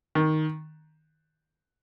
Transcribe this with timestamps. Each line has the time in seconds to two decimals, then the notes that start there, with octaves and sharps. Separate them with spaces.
0.15 D#3